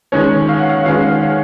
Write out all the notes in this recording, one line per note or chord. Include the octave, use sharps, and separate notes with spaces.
D#3 G#3 C#4 C#5
F5
F#5
F5
D#3 G#3 C#4 F5
C#5